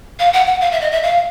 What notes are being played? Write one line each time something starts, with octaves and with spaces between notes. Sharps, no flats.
F5
F#5
F#5
F5
E5
D#5
E5
F5